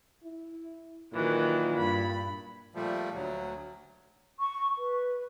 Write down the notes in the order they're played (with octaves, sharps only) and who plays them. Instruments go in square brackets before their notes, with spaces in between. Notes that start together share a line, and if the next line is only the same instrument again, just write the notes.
[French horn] E4
[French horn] A#2 [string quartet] D#3 E3 F#3
[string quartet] G2 B5
[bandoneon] A#2 F3 G3 A3
D2 F#3
[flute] C#6
B4